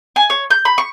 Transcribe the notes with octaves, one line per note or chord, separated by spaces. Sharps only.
G#5
C#5
G6
B5
C#6